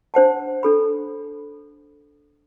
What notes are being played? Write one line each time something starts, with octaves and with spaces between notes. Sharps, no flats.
D4 C5 F#5 A5
D4 A4 B5